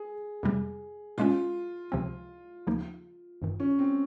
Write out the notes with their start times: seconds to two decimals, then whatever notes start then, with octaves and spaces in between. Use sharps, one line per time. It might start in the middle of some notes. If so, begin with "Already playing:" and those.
Already playing: G#4
0.43 F2 C3 G3
1.18 A#2 G#3 C#4 F4
1.92 C#2 C3 F3 C4
2.67 D#2 C#3 F3 A#3 D#4
3.42 G#1 G2 D#3
3.60 C#4
3.79 C4